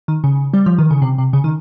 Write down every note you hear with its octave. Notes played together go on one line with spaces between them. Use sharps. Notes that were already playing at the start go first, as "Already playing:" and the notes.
D#3
C#3
G3
F3
D#3
C#3
C3
C3
C#3
D#3